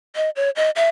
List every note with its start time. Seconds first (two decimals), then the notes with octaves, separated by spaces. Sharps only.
0.16 D#5
0.36 C#5
0.56 D#5
0.76 E5